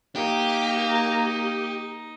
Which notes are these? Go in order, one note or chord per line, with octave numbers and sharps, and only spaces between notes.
A#3 D#4 G4